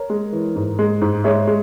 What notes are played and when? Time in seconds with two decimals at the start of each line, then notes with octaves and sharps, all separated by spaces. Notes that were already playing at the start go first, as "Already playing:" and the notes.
Already playing: A#4 C#5
0.10 G#3
0.32 E3
0.56 G#2
0.79 G#3
1.01 G#2
1.24 G#3 C#5 E5
1.47 G#3